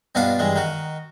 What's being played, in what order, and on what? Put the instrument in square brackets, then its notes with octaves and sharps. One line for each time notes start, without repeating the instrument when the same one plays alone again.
[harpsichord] G2 B2 B3 D4 F4 A5
G2 E3 G#3
D#3 F#4